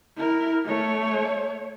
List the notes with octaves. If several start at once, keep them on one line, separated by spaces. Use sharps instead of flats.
E4 A#4
A3 C#5